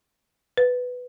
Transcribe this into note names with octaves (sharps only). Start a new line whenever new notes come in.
B4